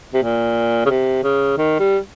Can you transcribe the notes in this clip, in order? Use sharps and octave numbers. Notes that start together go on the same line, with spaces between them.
C3
A#2
C#3
C3
C#3
D#3
G3